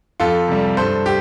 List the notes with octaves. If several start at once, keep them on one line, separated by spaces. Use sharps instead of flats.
F2 F4 A4
C3 G3
G2 A4 C5
G4